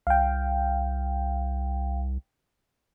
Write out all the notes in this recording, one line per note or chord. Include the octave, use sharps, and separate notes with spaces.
C2 F5 G5